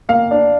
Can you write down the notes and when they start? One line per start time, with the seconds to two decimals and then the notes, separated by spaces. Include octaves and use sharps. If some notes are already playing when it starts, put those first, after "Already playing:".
0.09 A#3 F5
0.31 D4